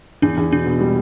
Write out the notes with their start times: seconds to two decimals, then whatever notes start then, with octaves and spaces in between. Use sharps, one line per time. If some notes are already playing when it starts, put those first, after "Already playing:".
0.22 E2 D4
0.37 E2
0.52 B2 D4
0.66 B2
0.80 G3